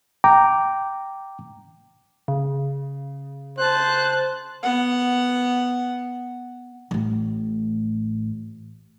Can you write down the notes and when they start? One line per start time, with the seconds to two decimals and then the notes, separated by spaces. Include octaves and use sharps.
0.24 G5 A#5 D6
2.28 C#3
3.59 C5 A5 F#6
4.63 B3 F#5
6.91 A1 A2